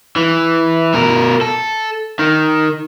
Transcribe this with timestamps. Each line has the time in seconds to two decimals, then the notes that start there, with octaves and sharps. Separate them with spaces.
0.16 E3
0.94 B2 A#4
1.41 A4
2.19 D#3